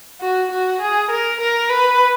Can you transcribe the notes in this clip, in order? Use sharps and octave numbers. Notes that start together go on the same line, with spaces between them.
F#4
F#4
G#4
A#4
A#4
B4